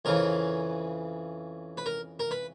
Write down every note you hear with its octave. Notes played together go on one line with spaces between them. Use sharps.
F2 C#3 E3 A#4
B4
A#4
A#4
B4